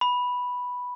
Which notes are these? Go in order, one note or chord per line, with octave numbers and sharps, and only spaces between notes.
B5